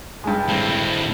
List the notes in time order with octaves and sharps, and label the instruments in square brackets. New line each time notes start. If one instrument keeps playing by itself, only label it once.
[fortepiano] G2 G#3
[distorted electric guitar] A2 C4